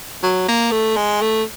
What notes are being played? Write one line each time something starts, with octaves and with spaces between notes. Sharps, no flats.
F#3
A#3
A3
G#3
A3